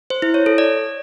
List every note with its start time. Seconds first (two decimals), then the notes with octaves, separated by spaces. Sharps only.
0.10 C5
0.22 E4
0.34 C#5
0.46 A4
0.58 D5